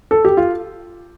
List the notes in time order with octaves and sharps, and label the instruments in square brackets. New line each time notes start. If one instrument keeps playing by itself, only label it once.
[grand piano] A4
G4
F4